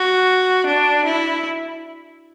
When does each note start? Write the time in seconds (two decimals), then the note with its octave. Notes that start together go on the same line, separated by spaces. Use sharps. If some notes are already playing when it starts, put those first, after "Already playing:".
Already playing: F#4
0.67 D4
1.05 E4